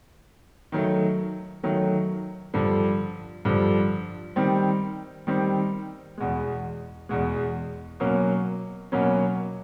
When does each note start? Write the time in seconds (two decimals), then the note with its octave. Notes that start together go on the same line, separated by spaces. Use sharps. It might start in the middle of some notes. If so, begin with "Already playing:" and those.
0.72 D#3 F#3 A3
1.63 D#3 F#3 A3
2.54 G2 D3 F3
3.45 G2 D3 F3
4.36 D#3 G3 C4
5.27 D#3 G3 C4
6.18 E2 B2 G#3
7.09 E2 B2 G#3
8.00 B2 F#3 A#3 C#4
8.92 B2 F#3 A#3 C#4